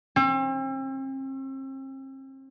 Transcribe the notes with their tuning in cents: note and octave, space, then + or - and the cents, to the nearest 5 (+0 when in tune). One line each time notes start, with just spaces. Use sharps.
C4 +40